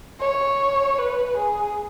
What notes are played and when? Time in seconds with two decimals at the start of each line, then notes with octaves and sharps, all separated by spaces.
0.21 C#5
0.98 B4
1.37 G#4